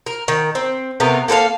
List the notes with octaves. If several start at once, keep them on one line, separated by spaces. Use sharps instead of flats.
A#4
D#3
C4
C3 A3 B3 A#4
A#3 A4 B4 F5